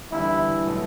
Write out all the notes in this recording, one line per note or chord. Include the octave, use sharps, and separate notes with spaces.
E2 D3 G3 E4
B2 F#3 A3